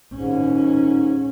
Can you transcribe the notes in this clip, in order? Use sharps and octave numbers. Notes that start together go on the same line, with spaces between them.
D#2 G#2 C#4